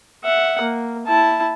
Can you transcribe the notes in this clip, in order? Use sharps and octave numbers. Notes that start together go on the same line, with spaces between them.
E5 F#5
A#3
E4 A5